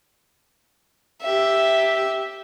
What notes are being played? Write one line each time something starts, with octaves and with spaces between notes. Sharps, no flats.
G4 E5